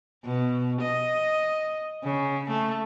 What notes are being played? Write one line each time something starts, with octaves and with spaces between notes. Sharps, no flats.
B2
D#5
C#3
A3